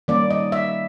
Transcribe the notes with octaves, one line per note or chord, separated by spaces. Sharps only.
D#3 G3 A#3 C#4 D5
D#5
E5